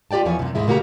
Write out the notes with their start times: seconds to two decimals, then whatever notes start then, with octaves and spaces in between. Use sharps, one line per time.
0.11 F4 G4 D5 G5 A5
0.25 E2 E3 F3 C#5 G#5
0.39 F#2 C3
0.55 D#2 G#2 G#3 E4
0.67 A#2 C#3 A#3 F#4 G4 A#5